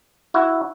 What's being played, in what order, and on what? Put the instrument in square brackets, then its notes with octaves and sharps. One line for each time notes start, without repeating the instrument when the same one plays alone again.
[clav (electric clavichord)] E4 F#4